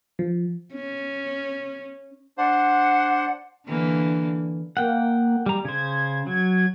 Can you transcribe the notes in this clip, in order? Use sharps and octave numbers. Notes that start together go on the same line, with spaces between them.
F3
C#4
D4 C5 F#5
D3 E3 A#3
A#3 F#5 G5
G3 A#5
C#3 C5 G#6
F#3 G#6